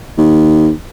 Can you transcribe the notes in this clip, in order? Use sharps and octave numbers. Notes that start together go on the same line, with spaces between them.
D#2